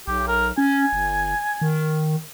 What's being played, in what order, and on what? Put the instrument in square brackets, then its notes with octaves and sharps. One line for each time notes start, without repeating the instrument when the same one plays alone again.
[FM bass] B1 [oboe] G4
[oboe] A#4
[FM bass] C#4 [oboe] G#5
[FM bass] G1
D#3